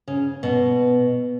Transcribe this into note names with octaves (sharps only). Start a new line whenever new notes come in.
C#3
B2